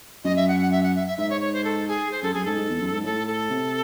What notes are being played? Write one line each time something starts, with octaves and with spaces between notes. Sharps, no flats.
F#2 D#5
E5
F#5
F#5
E5
F#5
E5
E5
G#2 E5
C#5
C#5
C5
A4
G#4
C5
F#2 A4
F#2 G#4
G#2 A4
G#2
E2
F#2
G#2
A2 A4
A4
C3